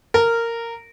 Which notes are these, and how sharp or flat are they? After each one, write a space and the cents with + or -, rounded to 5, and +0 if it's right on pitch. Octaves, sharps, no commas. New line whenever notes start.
A#4 -15